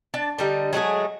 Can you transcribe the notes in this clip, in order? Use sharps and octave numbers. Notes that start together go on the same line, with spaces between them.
D4 A5
D3 G3 D#4
F#3 G#3 A3 G#4